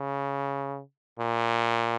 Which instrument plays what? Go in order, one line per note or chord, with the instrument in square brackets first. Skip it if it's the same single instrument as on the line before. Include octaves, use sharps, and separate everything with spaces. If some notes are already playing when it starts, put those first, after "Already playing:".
Already playing: [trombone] C#3
A#2